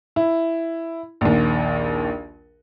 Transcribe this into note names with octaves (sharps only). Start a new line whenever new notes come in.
E4
A#1 D#2